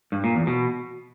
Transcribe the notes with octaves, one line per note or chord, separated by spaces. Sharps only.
G2
A#2
E2
B2